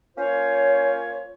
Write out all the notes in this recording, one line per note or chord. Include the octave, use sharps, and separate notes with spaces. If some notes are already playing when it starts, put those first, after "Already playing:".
A#3 C#4 F4 C5 C#5